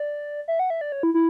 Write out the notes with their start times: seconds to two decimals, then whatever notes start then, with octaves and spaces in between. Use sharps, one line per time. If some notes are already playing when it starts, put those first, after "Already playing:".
Already playing: D5
0.48 E5
0.59 F#5
0.70 E5
0.81 D5
0.92 C#5
1.03 E4
1.14 E4